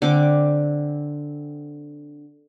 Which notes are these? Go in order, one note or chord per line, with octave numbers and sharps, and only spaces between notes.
D3 C4 D6